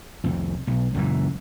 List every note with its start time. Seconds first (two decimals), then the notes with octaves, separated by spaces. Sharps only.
0.24 C2 F2
0.67 B1
0.94 C#2 F#2 A#2 E3